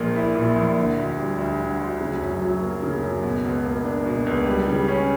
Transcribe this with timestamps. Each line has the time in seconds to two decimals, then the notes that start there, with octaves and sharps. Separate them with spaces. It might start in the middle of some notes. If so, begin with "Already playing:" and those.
Already playing: A#1 A#2 A#3
0.15 E4
0.35 A#2
0.56 A#1
0.77 D3
0.97 D2
1.17 G3
1.38 D2
1.59 D3
1.79 D2
2.01 C#3
2.20 F#2
2.42 F#3
2.61 A#3
2.83 C#3
3.03 F#2
3.23 B2
3.44 C#2
3.65 A#3
3.84 D4
4.05 B2
4.26 C#2
4.46 G3
4.68 C#3
4.88 C#4